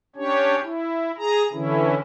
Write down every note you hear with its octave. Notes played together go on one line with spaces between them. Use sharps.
C#4 D4 G4 C#5
E4
G#4 A#5
D3 E3 C#4 E4